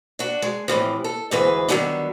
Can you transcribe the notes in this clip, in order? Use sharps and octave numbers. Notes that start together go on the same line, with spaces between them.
D4 F#4
G#3
A2 C3 E3 F3
A4
D2 G#2 E3 G#4 B4
D3 D#3 F#3 G3 B3 D4